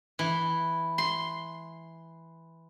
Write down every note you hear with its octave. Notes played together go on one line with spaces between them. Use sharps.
E3
C6